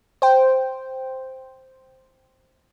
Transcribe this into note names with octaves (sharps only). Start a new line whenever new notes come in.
C5 G5